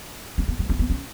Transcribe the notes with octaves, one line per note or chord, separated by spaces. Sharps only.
C#4
B3
G#3
C#4
B3
C#4